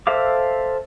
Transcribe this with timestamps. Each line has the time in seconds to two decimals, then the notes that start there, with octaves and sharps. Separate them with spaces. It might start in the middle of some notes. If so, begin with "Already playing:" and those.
0.07 A4 C5 E5 F5 D6